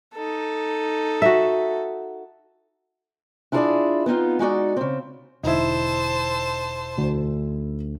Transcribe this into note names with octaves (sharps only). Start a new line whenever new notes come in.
D#4 A4
F#4 E5
D4 E4 F4 G#4 B4 D5
B3 C4 D#4 F4
G#3 D#4 F#4 D5
C#3 C4
E1 D3 D#4 E4 C5 A5
D2